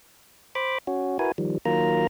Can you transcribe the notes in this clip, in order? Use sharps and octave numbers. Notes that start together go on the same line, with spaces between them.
C5 B5 D6
C#4 F#4
E4 F#4 A#4 B4 G#5
D#3 F3 G3
D#3 F#3 A#3 F4 A#4 A#5